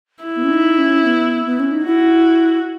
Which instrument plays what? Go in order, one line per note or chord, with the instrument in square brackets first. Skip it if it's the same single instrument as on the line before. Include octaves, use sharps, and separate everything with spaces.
[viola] E4
[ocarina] B3
C#4
D#4
C#4
B3
B3
C#4
D#4
[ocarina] E4 [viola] F#4